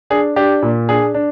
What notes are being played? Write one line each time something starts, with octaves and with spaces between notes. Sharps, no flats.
D4 G#4
D4 G4
A#2
D4 G#4
D4